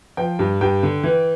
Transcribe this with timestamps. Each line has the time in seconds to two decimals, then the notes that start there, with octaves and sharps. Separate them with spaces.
0.17 F3 G5
0.39 G2
0.61 G2 G5
0.83 D3
1.04 E3